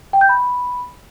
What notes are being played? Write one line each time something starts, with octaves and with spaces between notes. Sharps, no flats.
G5
G6
B5